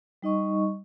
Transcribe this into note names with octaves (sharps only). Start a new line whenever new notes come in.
G3 D#4 D#5 C#6